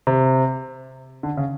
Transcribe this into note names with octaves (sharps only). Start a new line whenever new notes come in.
C3
D3
C#3